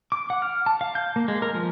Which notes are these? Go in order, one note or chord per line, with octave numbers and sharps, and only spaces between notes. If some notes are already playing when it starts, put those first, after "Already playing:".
D6
F#5
F6
A5
F5
G6
A#3
G#3
A#4
F3